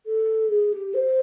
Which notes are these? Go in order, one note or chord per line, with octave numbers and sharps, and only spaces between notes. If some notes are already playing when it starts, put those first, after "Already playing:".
A4
G#4
G4
C5